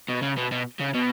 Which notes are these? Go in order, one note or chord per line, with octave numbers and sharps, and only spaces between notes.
B2
C#3
B2
B2
C#3
B2